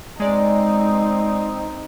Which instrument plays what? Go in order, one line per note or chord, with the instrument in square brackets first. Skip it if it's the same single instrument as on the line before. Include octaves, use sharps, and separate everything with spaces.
[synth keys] G#3 D5 [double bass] C4 D#4